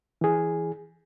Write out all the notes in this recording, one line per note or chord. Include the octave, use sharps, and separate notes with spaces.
E3 G#4